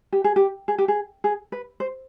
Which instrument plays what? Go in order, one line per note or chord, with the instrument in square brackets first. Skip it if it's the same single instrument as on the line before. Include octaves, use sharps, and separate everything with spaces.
[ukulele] G4
G#4
G4
G#4
G4
G#4
G#4
B4
C5